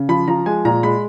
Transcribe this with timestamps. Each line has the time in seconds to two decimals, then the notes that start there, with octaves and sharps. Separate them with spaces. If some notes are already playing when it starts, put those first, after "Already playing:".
Already playing: C#3
0.09 F3 B5
0.28 F3 A#5
0.46 G#3 G#5
0.65 A#2 A#5
0.83 G#3 B5